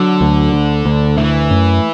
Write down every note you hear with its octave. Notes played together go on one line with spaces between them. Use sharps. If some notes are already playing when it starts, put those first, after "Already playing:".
Already playing: D3 F#3
D2
D2
D2
E3 A3
F#2